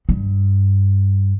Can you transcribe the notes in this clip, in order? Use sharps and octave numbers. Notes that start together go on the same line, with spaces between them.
G2